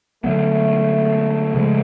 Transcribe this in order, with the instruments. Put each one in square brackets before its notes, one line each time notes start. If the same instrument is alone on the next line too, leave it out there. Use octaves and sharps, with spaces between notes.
[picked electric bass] D3 F#3 B3 [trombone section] A3
[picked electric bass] C#3 F3 G#3